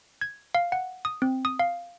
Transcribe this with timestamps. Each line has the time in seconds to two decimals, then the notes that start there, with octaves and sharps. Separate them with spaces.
0.21 G#6
0.55 F5
0.72 F#5
1.05 D#6
1.22 C4
1.45 D#6
1.59 F5